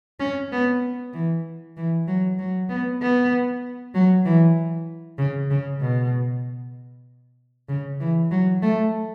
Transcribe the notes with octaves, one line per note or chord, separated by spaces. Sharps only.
C#4
B3
E3
E3
F#3
F#3
B3
B3
F#3
E3
C#3
C#3
B2
C#3
E3
F#3
A3